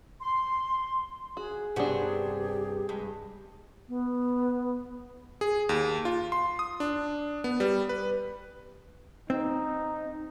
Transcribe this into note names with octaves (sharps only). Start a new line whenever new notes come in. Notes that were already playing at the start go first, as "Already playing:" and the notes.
C6
F#4 G#4
G2 C3 B3 D4 F#4 G4
G2 G#3
B3
G#4
D#2
F4
C6
D#6
D4
B3
G3
B4
C4 D#4